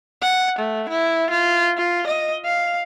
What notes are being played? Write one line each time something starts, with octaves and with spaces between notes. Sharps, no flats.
F#5
A3
E4
F4
F4
D#5
F5